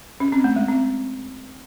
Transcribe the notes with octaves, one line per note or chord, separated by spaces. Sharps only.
C#4
C4
A3
G#3
C4